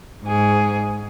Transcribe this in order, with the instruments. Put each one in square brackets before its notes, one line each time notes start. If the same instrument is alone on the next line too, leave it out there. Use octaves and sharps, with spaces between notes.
[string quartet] G#2 G#4